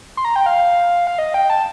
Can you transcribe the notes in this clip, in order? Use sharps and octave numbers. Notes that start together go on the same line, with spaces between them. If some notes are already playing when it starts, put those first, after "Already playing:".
C6
A#5
G5
F5
F5
D#5
G5
A5